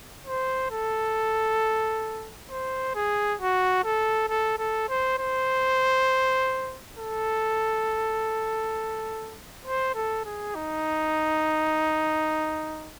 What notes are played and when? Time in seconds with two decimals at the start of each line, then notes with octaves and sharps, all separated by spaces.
0.27 C5
0.71 A4
2.50 C5
2.95 G#4
3.40 F#4
3.84 A4
4.29 A4
4.58 A4
4.89 C5
5.18 C5
6.98 A4
9.65 C5
9.95 A4
10.25 G#4
10.55 D#4